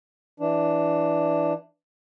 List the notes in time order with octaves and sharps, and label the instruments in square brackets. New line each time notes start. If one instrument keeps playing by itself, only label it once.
[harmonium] E3 D4